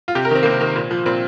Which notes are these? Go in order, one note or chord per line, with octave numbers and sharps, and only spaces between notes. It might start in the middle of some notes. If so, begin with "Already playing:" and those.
F4
C3 G4
A#4
D#3 C4
A#3
C3
C4
D#3
A#2
F3
A#2 C4